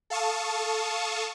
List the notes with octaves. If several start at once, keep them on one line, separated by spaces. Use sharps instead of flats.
A4 F5 A5 C#6 D#6